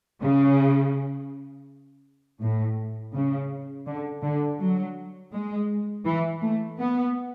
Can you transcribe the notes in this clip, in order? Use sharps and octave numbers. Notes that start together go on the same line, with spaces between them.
C#3
A2
C#3
D3
D3
F#3
G#3
E3
A3
B3